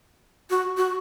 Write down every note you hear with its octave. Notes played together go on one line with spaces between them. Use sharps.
F#4
F#4